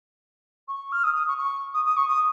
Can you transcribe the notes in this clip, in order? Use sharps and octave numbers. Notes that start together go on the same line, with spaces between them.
C#6
F6
D#6
D#6
C#6
C#6
D#6
D#6
C#6
D#6